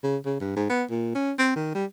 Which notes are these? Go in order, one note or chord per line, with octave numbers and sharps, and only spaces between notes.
C#3
C#3
G2
G#2
B3
A#2
C#4
C4
D#3
G3